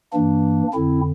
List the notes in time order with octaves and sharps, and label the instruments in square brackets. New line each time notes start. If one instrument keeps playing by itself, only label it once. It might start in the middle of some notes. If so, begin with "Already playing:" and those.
[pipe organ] G2 E3 A#3 D4
F2 D3 C4 E4